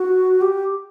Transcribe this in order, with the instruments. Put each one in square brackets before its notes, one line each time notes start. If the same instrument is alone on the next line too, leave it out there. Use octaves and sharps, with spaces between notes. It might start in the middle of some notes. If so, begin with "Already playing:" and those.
Already playing: [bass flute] F#4
G4